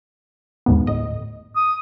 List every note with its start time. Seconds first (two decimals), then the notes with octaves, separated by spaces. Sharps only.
0.66 D#2 G#2 B3
0.87 G1 A2 D#5
1.56 D#6